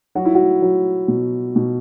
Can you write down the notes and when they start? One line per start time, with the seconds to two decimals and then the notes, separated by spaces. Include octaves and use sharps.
0.15 F#3 F#4
0.25 E4
0.35 F#4
0.62 F#3
1.08 B2
1.56 B2